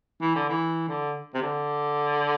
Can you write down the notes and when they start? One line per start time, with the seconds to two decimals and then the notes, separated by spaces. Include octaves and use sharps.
0.22 E3
0.36 D3
0.49 E3
0.89 D3
1.34 C3
1.42 D3